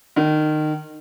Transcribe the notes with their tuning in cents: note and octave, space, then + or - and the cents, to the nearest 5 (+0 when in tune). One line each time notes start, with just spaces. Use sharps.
D#3 -25